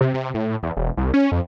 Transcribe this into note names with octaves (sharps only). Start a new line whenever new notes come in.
C3
C3
A2
E2
E1
C2
C#4
F2